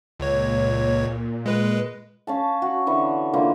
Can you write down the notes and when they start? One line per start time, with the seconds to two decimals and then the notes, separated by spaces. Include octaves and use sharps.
0.19 C#2 A#2 C#5
1.46 G#3 B4
2.27 C#4 F5 A5
2.62 F#4
2.87 D3 E3 C#6
3.33 D3 E3 A#3 F4